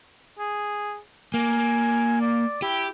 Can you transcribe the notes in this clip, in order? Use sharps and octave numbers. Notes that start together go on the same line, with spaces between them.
G#4
A#3 G#5
D5
E4 G4